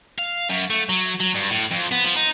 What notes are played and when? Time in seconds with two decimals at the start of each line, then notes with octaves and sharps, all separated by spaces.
0.18 F5
0.50 F#2
0.70 A3
0.89 F#3
1.20 F#3
1.34 G2
1.50 A2
1.71 F2
1.91 B3
2.04 F3
2.16 D#4